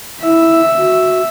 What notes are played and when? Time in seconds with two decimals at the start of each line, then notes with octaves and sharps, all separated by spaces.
0.23 E4 E5
0.78 F#4